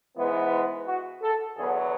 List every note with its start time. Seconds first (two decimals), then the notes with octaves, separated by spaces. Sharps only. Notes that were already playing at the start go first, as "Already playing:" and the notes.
0.17 G#2 E3 G#3 B3
0.86 F#4
1.21 A4
1.57 E2 D3 F#3 B3 G#4